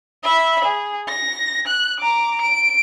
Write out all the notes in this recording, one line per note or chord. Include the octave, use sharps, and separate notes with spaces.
E5 B5
G#4
A#6
F#6
A#5 D6
D7